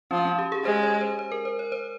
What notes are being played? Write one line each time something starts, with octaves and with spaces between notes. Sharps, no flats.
F3 C#4
C#4
G4
G#4
G#3 C5
C#5
C5
C5
A#4
C5
C#5
C5